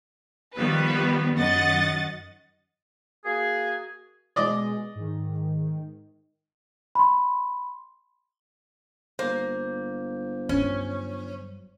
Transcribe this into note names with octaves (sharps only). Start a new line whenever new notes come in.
D#3 F3 G3 B3 B4
F#2 D#3 D#5 F#5 A6
A#3 F#4 G#4
B2 G#3 D5 D#5 D6
G#2 D#3
B5 C6
G1 A#3 C5
G2 F#3 C#4